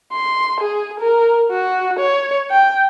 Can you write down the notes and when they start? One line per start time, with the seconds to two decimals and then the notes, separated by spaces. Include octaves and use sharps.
0.13 C6
0.61 G#4
1.00 A#4
1.51 F#4
1.99 C#5
2.51 G5